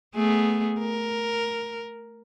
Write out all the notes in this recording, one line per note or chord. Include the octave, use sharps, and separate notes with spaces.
A3 B3 G#4
A#4